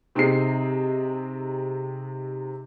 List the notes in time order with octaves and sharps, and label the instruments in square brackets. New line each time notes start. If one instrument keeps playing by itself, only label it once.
[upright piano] C3 C4 D#4 G#4 D#5 C7